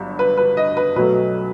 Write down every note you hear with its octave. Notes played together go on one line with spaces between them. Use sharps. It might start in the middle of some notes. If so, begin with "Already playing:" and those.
Already playing: G1 G2 F#3
B4
B4
D#5
B4
B1 B2 F#3 A3 B4